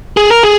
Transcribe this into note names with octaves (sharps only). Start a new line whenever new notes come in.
G#4
A#4
G#4